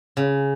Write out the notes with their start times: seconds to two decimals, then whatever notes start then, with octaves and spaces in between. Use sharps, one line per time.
0.17 C#3